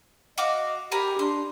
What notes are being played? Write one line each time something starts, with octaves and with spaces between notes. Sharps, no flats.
F#4 D#5 F5 D6
G4 A#4 G#5 B5
D4 C6